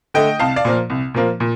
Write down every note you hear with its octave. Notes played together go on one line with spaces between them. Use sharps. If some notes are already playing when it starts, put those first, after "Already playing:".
D3 A3 D#5 G5
C2 F5 A5
D5 F5
A#2 F3 A#3
C2
A#2 F3 A#3
A#2